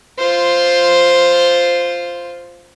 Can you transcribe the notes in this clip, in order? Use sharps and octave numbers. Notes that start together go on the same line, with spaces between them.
F4 C5